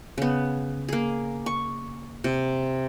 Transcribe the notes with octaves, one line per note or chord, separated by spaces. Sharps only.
C#3 B3
A#3 G#4
C#6
C3